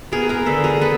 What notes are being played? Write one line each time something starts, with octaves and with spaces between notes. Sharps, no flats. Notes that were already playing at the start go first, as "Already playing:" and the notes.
B3 G#4 A#4
G#4 A#4
D3 A4 B4
G#4 A#4
B3 A4 B4